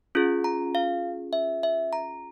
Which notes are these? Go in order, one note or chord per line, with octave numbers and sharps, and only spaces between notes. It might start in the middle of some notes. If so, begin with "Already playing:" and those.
C#4 F4 G#4
A#5
F5
E5
E5
A#5